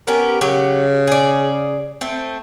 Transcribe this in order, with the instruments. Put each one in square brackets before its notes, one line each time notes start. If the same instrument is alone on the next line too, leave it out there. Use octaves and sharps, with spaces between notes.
[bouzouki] B3 C#4 G4 [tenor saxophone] A#4
[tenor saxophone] C#3 [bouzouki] F#3 G4
[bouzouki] G#4 D5
A3 C4